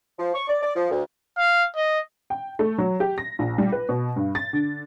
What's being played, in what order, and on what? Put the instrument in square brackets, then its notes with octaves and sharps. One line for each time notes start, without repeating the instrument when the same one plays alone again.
[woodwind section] F3
C#6
D5
D5
F3
D2
[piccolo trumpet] F5
D#5
[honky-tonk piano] G5
A3
F#3
G4
A#6
A#1
G3
B4
B2
G2
A6
D3